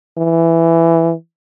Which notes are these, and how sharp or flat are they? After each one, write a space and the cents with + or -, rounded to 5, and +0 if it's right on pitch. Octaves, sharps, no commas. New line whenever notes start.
E3 +10